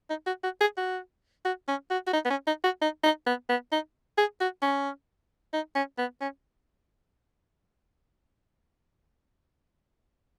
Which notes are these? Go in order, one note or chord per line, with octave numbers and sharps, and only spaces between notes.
D#4
F#4
F#4
G#4
F#4
F#4
C#4
F#4
F#4
D#4
B3
C#4
D#4
F#4
D#4
D#4
B3
B3
D#4
G#4
F#4
C#4
D#4
C#4
B3
C#4